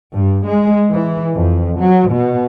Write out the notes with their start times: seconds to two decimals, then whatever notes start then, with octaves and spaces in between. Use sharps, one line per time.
0.15 G2
0.47 G#3
0.92 E3
1.35 F2
1.80 F#3
2.12 B2